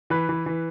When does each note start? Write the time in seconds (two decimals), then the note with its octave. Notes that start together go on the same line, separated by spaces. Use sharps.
0.10 E3 B4
0.29 E3
0.46 E3